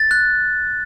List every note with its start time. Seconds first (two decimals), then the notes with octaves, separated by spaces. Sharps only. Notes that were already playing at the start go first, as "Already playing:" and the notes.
Already playing: A6
0.11 F#6